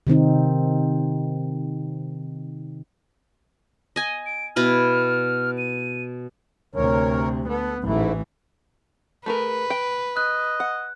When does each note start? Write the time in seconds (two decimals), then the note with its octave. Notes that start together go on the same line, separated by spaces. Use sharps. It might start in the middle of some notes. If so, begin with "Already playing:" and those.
0.07 C3 D#3 C4 D#4
3.96 D#5 G#5
4.26 D7
4.56 B2 E4 B4 F6
5.58 D#7
6.75 D2 C3 A#4 C#5
7.48 B3 A4
7.84 A1 G#2 E3 A3 E4
9.26 A3 G#4 A#4 B4
9.70 G5
10.17 D#5 F#6
10.60 F#5